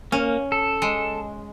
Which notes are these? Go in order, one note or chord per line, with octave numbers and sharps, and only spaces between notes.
A#3 C#4
A4
G#3